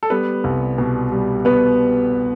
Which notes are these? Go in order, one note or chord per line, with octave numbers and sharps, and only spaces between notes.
A4
G3 B3 B4
C2
B2
G3
B2 B3 B4